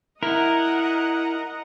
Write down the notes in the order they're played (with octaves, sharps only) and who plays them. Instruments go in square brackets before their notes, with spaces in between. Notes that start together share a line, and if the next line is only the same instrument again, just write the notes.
[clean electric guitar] E4 [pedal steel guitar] A#4 [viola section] D#5 F#5 A#5